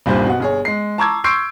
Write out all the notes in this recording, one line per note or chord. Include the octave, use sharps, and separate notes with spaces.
D#1 C2 G2 A#2 G4 C5
B2 F#5
G1 G#4 C#5
G#3 C7
A5 A#5 C#6 D6 E6 G#6
C6 C#6 E6 G6 C7 D7